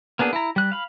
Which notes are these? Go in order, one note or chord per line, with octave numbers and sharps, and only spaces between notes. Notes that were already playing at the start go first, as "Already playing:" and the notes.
A#3 B3 D4 G#4
E4 A#5
G3 F#6
F5 B5